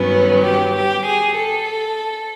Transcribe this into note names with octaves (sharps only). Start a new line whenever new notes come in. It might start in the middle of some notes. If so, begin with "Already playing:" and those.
Already playing: G2 D#3 F#3 B3 C#4
G4
G4
G#4
A4